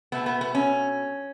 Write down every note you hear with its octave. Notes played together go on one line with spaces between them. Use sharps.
B2 A3 B3
B3
B3
C#4